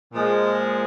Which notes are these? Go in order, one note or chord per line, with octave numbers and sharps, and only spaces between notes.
A#2 F3 G#3